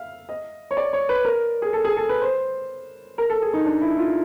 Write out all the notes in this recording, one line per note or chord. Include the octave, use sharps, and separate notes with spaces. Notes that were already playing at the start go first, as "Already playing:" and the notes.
Already playing: E5 F5
D#5
C#5
D5
C#5
B4
A#4
G#4
A4
G#4
A4
B4
C5
A#4
A4
G#4
D#4
D4
E4
F4